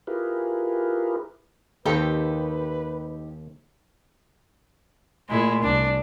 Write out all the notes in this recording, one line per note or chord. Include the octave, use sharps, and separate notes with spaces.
E4 F4 G4 G#4 A#4 B4
D#2 D#3 C4 D#4 G4 A4 B4
A#2 G#3 A3 E4
C2 D4